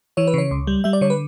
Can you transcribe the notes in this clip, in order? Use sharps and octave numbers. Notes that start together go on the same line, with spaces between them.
E3 C#5
B4
C#3 C#5
C#2
G3
G3 E5
D5
D3 C#5
B4